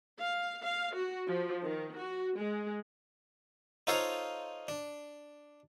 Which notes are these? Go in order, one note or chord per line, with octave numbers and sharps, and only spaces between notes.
F5
F5
F#4
F3
D#3
F#4
G#3
D#4 F4 A4 C5 C#5 F5
D4